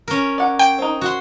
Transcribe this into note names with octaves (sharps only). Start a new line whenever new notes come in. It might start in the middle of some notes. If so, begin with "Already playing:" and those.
C#4 A#4
D5 F#5
G5
C4 D#4
F#4 C6